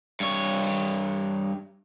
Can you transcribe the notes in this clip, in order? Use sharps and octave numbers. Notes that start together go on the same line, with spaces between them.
G2 C#5